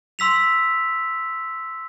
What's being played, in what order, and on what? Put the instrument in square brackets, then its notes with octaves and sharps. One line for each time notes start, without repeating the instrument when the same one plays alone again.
[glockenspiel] C6 E6 B6 F7